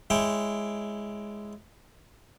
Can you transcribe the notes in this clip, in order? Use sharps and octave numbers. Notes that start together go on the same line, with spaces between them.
G#3 E4 C#5 G5